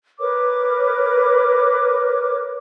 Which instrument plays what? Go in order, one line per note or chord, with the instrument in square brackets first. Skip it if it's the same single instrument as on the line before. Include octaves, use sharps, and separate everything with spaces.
[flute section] A#4 B4 C#5 D6